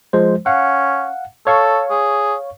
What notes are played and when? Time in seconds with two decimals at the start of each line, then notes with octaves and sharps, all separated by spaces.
0.13 F3 G#3 C5
0.46 C#4 F5 F#5
1.47 A4 C#5 F5 C#6
1.90 G#4